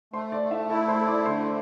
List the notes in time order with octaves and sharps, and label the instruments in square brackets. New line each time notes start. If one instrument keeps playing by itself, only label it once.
[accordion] A3 [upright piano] C5 C6
[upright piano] D5
[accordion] A3
[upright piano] E4 E5
[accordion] E4 [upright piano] A4 A5
[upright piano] C5 C6
[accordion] A3
[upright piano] D5 D6
[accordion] D3 [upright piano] C5 C6